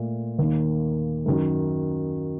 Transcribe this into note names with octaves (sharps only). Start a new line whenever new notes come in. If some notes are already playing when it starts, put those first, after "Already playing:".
Already playing: A#2 A3
D#2 D#3 A#3
F#2 D#3 F#3